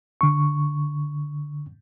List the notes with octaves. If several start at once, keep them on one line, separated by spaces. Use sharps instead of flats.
D3 C#6